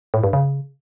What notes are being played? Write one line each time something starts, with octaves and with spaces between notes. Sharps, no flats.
A2
G2
C#3